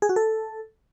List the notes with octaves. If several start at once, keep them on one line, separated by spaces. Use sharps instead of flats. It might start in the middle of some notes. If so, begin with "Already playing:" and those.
G#4
F#4
A4